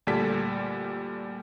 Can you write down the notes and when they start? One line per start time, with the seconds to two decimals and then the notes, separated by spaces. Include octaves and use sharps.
0.07 D2 A#2 G3 A4 B6